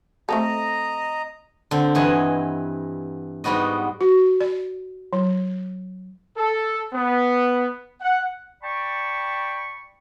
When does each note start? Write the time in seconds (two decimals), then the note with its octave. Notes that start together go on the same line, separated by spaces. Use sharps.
0.29 A3 C4 A4 D#5 A#5
1.71 D3 C4
1.95 G2 E3 D#5 F#5 G#5
3.44 G#2 G3 B3 F#4 D#5
4.01 F#4
4.41 D5
5.13 F#3
6.37 A4
6.93 B3
8.01 F#5
8.63 D5 G5 A5 B5 C#6